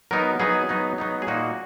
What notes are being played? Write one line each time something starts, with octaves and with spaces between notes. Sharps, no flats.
F#3 B3 D#4 A#4
F#3 B3 D#4 G#4
F#3 B3 D#4
F#3 B3 D#4
G#4
A#2 A#3 D#4 F#4